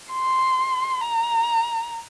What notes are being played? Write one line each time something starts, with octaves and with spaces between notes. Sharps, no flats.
C6
A#5